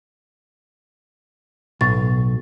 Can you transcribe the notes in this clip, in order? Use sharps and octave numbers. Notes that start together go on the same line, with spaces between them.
B1 A2 A6